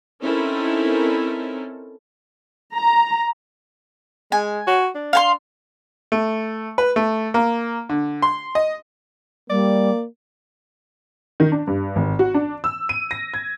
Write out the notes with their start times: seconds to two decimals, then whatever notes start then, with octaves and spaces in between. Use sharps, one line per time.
0.23 C4 C#4 D#4 E4 A4 A#4
2.76 A#5
4.32 G#3 G#5
4.67 F#4
4.95 D4
5.13 F5 G#5 C6
6.12 A3
6.78 B4
6.96 A3
7.34 A#3
7.89 D3
8.22 C6
8.55 D#5
9.50 G3 A#3 D5
11.40 D#3
11.52 D4
11.67 G2
11.96 G#1
12.19 F#4
12.34 D4
12.64 E6
12.89 D#7
13.11 A#6
13.34 G#6